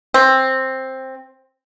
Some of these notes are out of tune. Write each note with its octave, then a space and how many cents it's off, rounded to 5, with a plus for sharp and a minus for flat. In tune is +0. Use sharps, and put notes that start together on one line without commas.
C4 +10